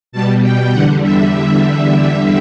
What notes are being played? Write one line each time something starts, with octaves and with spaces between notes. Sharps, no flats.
B2 G3 A5
G5
E2 D3 G3 F#5
E5